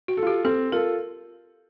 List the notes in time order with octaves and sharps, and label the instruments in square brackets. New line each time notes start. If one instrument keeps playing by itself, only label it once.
[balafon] F#4
[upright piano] A4
[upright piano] F4 [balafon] G4
[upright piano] C4 [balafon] A4
[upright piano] F4 A4 [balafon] A#4